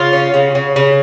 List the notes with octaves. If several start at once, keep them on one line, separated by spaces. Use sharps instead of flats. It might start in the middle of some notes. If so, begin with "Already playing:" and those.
Already playing: C#3 F4
C#4
C#3
C#3
C#3